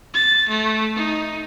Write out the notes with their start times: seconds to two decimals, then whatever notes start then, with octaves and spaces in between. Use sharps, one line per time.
0.14 A6
0.49 A3
0.96 D#4